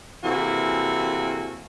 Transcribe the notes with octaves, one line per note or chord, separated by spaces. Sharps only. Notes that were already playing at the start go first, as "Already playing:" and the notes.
C3 E3 A#3 F#4 G#4 A4